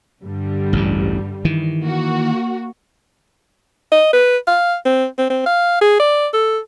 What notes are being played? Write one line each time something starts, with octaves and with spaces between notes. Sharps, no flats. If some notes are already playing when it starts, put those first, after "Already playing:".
G2 D3 G3
A1 D2 G#2
D#3 E3
A#3 F#4
D#5
B4
F5
C4
C4
C4
F5
G#4
D5
A4